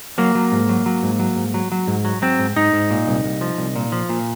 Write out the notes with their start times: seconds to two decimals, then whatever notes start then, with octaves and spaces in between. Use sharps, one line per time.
0.18 F#3 A#3
0.35 F#3
0.52 G#2
0.69 F#3
0.86 F#3
1.03 G#2
1.19 F#3
1.37 G#2
1.54 F#3
1.72 F#3
1.88 G#2
2.05 F#3
2.22 F#3 C4
2.39 G#2
2.56 G#2 D#4
2.73 G#2
2.91 A#2
3.08 C2
3.24 C2
3.41 F3
3.58 C2
3.76 A#2
3.92 F3
4.09 A#2